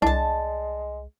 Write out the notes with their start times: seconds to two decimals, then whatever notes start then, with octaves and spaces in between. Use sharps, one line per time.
0.02 C2 G#3 D4 A5